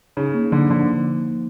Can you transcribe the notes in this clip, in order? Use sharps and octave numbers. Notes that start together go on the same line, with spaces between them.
C#3 D#4
A#3
D3 F3
D3 F3